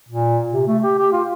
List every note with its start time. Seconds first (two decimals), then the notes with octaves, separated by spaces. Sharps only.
0.08 A#2
0.53 C3
0.67 A3
0.83 G4
0.99 G4
1.12 F4